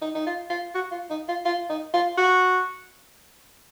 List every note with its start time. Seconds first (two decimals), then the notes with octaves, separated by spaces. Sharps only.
0.02 D#4
0.15 D#4
0.27 F4
0.50 F4
0.75 F#4
0.92 F4
1.10 D#4
1.29 F4
1.45 F4
1.70 D#4
1.94 F4
2.18 F#4